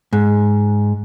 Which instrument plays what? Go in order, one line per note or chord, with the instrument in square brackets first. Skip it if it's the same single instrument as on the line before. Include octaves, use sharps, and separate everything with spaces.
[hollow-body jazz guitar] G#2